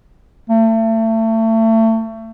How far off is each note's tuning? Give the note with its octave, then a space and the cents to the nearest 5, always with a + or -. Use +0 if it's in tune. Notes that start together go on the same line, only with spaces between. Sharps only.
A3 +30